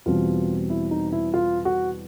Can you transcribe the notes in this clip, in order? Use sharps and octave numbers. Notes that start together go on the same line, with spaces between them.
E2 B2 G3 C4 F4
E4
D#4
E4
F4
F#4